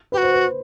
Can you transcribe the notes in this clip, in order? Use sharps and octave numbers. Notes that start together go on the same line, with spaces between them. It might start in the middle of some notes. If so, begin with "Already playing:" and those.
F#4 G4 B4
C5
B4